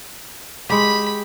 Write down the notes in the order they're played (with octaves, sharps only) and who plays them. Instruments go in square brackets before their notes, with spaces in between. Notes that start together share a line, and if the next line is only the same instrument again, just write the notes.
[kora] G#3 G4 [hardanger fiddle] B5